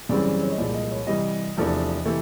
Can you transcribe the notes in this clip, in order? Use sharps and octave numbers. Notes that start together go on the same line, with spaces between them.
F#2 C#3 E3 G3 C4 D5
D5
C#5
D#5
C2 A#2 F3 G#3 D5
D#5
C#5
C3 E3 G3 D#5
E2 C3 F3 A3 D4
C3 E3 A3